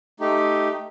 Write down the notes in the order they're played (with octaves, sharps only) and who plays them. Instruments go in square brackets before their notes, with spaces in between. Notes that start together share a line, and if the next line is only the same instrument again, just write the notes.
[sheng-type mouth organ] A3 D#4 G4